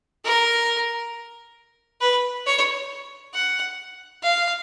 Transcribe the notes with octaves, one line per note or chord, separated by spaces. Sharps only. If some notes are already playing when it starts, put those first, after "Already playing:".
A#4
B4
C#5
F#5
F5